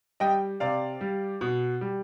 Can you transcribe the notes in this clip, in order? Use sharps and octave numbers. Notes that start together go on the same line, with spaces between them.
G3 D#5 G5
C3 D5 F5
G3
B2
G3